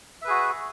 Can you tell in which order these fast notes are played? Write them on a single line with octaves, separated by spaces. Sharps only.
E5 B4 G#4 F#4